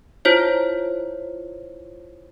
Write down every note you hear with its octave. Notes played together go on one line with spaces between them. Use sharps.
E4 F4 C5 C#5